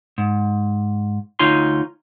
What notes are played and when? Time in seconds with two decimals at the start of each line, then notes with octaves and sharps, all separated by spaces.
0.18 G#2
1.39 D2 D#4 F4 C#5 G#5 C6